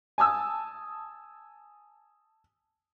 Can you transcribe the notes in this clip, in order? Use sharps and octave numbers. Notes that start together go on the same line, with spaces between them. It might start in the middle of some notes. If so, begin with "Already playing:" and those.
G#5 A5 D#6 E6